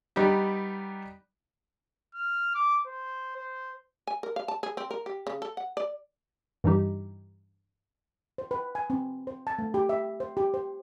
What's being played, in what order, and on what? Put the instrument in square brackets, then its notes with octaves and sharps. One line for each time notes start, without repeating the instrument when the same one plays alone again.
[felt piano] G3 B3 D#4 G4
[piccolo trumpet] F6
D6
C5
C5
[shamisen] G#5
A#4
F5
A5
G#4
C4
A#4
G4
C#3
A4
F#5
D5
[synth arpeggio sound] G2 E3 G3 D#4 G4
[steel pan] C5
B4
G#5
C4
C5
A5
A3
G4
E5
C5
G4
C5